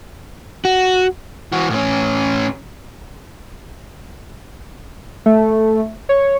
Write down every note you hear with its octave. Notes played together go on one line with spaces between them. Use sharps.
F#4
E3 F#4
A2 C#4
A3
C#5